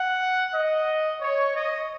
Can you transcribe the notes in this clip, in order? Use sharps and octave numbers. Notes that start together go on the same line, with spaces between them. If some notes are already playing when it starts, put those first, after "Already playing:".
Already playing: F#5
D#5
C#5
D#5